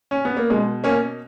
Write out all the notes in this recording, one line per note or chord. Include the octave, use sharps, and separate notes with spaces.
C#4
B3
A#3
B2 G#3
A#3 C#4